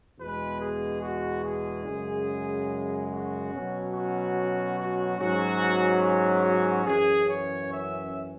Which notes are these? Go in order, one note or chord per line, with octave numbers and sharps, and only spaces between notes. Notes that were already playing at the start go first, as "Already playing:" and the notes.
E2 B2 G#3 B4
G#4
F#4
G#4
F#2 C#3 G#3
F#4
B2 F#3 C#4
F#4
F#4
G#2 F#3 C#4 F#4
F#4
F#4
F#2 E3 C#4 G#4
C#5
E5